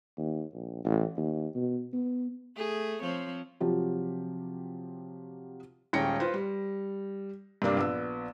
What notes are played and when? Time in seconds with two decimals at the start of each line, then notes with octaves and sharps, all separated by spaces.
0.18 D#2
0.54 A#1
0.85 A1
1.17 D#2
1.55 B2
1.93 B3
2.56 A3 G#4
3.02 F3 C4 C#5
3.60 C3 F3 F#3 F4 G4
5.93 D#1 G#3 C#4 G5 A#6 C#7
6.20 F4 B4 C5
6.34 G3
7.62 G2 C3 A#3 D4
7.77 A#1 B3 E6